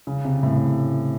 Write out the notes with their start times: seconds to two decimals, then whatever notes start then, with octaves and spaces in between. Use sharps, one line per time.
0.07 C#3
0.25 C3
0.43 A2